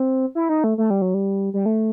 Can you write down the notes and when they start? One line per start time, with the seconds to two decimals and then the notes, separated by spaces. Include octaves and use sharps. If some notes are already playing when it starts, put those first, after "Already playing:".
Already playing: C4
0.35 E4
0.49 D#4
0.64 A3
0.78 A3
0.90 G3
1.02 F#3
1.14 G3
1.54 G3
1.66 A3